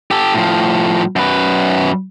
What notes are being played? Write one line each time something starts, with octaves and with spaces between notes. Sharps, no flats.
G4 A4
A2 F3
F#2 B4